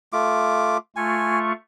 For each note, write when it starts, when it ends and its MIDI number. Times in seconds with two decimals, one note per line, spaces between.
0.13 0.77 57
0.13 0.77 65
0.13 0.77 86
0.96 1.53 57
0.96 1.53 65
0.96 1.39 80
0.96 1.53 85